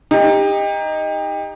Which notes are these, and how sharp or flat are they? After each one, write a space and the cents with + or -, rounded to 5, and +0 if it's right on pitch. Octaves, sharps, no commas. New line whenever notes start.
D#4 +0 G4 +30